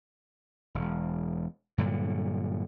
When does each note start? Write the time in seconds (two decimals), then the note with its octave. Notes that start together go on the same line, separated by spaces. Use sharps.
0.75 E1
1.78 G2 A#2 D3 F#3